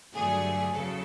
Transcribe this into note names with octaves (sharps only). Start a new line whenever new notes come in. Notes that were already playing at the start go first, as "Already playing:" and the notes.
G2 D3 F#3 A3 G#4
E2 C#3 F#3 A4